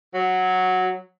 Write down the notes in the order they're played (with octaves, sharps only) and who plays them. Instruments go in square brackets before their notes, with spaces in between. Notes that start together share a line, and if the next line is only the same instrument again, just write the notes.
[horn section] F#3